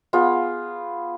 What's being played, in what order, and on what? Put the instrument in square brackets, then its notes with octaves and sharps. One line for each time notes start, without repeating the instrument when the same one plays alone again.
[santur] B3 F4 G#4